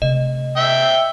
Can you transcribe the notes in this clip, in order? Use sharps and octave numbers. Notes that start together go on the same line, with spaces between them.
C3 A3 D#5
E5 G5